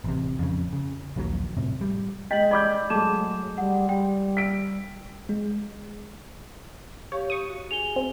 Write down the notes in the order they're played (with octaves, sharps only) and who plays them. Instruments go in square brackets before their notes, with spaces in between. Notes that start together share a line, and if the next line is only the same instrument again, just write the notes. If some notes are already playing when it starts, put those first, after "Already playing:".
[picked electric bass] A1 C3
F2 C#3
C#3
A#1 D#2 D3 F#3
A2 C3
G3
[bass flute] G#3 [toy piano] D#5 [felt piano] G5 [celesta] B6 F#7
[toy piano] D5 [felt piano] B5 D6 G6
[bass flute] F#3 [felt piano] G#3 A3 [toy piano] A5 D6 [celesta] E7
[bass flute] G3 [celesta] F#5
[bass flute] G3 [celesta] G5
[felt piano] B6 D7
[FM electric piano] G#3
[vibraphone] G4 F5 [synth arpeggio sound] C#5
[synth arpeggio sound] C#6 D#6
[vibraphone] F#4
[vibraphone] G#4 G#5 [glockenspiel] F7 G7
[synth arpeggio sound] C4